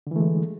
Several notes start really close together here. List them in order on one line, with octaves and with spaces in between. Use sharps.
D3 E3 A3 G#3